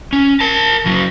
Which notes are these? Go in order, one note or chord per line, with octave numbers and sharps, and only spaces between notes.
C#4
A#4 A5
C#3 F#3